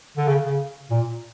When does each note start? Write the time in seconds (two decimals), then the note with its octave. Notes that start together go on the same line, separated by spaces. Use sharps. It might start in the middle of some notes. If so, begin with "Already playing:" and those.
0.17 D3
0.28 C#3
0.44 C#3
0.90 A#2